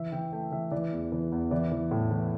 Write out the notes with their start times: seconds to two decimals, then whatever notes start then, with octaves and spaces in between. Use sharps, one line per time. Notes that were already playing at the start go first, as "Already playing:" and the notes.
Already playing: E3 E5
0.12 E3 G5
0.32 A3 G5
0.52 E3 E5
0.71 E3 D5
0.92 E2
1.12 E3
1.32 E2
1.51 E3 D5
1.72 E3
1.91 A2
2.11 E3